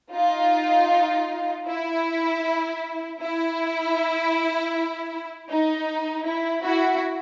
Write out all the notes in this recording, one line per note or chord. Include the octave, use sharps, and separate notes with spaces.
D#4 F4
E4
E4
D#4
E4
E4 F#4